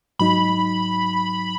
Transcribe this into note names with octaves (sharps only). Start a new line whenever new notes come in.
G#2 F#3 D#4 B5